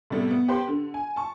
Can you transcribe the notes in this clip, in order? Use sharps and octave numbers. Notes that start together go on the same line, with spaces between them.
A2 C3 G3 A3 B3
B3
G4 B4 C5 C6
D3
G#5
A5 C#6